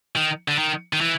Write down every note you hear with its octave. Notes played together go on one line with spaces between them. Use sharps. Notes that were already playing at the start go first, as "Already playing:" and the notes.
D#3
D3
D#3
D#3
E3